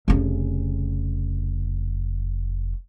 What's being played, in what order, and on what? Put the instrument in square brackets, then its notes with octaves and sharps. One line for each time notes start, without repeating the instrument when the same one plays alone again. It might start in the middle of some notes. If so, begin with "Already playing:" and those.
[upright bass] F1 C#3